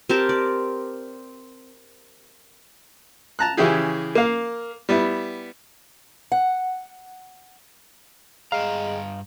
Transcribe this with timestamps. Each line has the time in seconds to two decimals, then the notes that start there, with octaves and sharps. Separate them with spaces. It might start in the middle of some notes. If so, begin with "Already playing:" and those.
0.09 C4 G4 A#4 A5
0.29 D5
3.39 A5 A#5 F#6
3.57 C#3 E3 C#4 E4 G4 G#4
4.15 A#3 F5
4.89 G3 B3 E4
6.32 F#5
8.52 G2 G#3 F5 G5 A#5